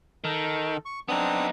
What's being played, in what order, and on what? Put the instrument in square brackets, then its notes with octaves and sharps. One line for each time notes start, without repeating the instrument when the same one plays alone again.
[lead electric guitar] D#3 [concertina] A4
[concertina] C#6
[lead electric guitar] B3 D#4 [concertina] C4 D4 D#6